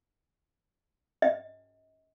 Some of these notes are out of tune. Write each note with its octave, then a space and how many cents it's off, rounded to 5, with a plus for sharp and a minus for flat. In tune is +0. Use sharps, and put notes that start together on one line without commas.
D#5 +35